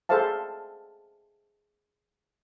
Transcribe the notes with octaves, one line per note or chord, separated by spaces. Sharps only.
G#4 A4 C5 E5 F5 A5